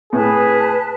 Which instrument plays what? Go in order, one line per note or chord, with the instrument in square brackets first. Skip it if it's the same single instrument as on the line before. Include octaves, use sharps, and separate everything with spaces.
[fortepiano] A2 [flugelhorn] G#4 [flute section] B4 A5